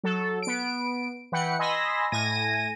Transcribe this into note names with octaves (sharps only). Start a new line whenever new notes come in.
F#3 A4
B3 D7
E3 B4 F#5 G5 C#7
D#5 G#5 B5 C6 E6 A#6
A2 G#5 A#6 D#7